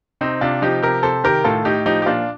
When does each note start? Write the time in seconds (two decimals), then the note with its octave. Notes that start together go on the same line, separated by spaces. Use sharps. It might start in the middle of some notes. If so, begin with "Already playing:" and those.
0.21 C3 C4 D#4
0.41 C3 D4 F4
0.62 F3 D#4 G4
0.83 C3 G4 A#4
1.03 C3 A4 C5
1.24 D#3 G4 A#4
1.44 A2 F4 A4
1.65 A2 D#4 G4
1.86 F3 D#4 G4
2.02 G4
2.06 A#2 D4 F4